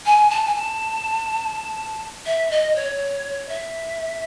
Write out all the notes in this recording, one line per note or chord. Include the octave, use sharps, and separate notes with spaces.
G#5
A5
G#5
A5
E5
D#5
C#5
E5